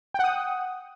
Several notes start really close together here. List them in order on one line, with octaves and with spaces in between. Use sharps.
G5 F#5 D#6